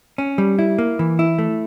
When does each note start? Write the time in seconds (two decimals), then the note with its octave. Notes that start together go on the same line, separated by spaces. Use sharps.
0.18 C#4
0.38 G3
0.59 E4
0.79 A#3
0.99 E3
1.19 E4
1.38 A3